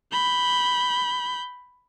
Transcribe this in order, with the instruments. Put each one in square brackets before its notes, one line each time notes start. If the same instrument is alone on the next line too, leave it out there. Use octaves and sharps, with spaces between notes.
[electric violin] B5 G6